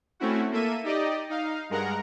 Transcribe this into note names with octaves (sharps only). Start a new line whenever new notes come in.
A3 C4 C#4 E4 F#4
A#3 A4 E5 D#7
D#4 G4 D5 D#5
D#4 F5
G2 G#3 A#4 F#5 A#5